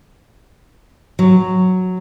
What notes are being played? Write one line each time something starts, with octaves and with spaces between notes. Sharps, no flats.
F#3